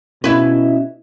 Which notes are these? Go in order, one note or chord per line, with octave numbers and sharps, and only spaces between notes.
B2 C#4 E4 B4 D#5 E5